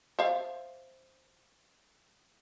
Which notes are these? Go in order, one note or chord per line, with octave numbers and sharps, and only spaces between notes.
C5 E5 F5